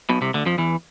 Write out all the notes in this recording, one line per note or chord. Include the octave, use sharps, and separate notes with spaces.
B1 B2
C2 C3
D2 D3
F2 F3
E2 E3